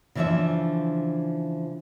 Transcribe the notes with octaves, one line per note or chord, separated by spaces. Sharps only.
C#3 E3 F3 D4 C#5 E5